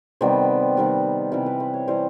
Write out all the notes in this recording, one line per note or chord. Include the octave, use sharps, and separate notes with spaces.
C3 D#3 G3 B3 C5
C3 D#3 G3 B3
C3 E3 G3 C5
B4
C5
C#5
C3 E3 G3 C5